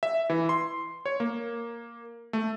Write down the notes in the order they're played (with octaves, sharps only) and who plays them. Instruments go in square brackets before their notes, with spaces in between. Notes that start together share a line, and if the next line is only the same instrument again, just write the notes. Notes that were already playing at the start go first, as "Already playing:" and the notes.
[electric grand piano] E5
E3
C6
C#5
A#3
A3